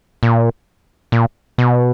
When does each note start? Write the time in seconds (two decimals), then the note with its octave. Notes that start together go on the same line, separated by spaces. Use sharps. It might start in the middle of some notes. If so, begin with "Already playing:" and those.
0.23 A#2
1.12 A#2
1.58 B2